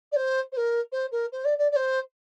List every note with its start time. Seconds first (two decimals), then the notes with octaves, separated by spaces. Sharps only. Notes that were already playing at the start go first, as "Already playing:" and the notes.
0.12 D5
0.16 C5
0.52 C5
0.57 A#4
0.92 C5
1.12 A#4
1.32 C5
1.45 D5
1.58 D5
1.72 D5
1.76 C5